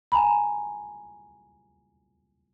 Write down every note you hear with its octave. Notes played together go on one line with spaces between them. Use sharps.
G#5 A#5 B5